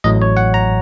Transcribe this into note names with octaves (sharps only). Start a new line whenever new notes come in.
A1 A2 F#3 D#5
C#5
F#5
A#5